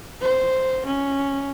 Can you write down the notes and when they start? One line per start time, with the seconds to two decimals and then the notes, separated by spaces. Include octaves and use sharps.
0.22 C5
0.86 C#4